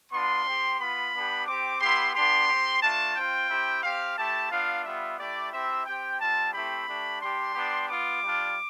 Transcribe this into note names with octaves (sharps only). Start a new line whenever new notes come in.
B3 D4 F4 C6
C4 G4
B3 F4 B5
B3 D4 G4
C4 G4 D6
B3 E4 G4 C6
B3 D4 G4 C6
C4 G4
A3 D4 F4 A5
C4 F4 G5
C4 E4 G4
C4 G4 F5
A3 E4 G4 A5
B3 D4 F4 F5
G3 B3 F4 E5
A3 E4 G4 D5
C4 E4 G4 E5
C4 G4 G5
G3 C4 F4 A5
A3 C4 E4 G4 B5
A3 D4 G4
G3 D4 G4 C6
G3 B3 D4 G4
B3 F4 D6
G3 D4 F4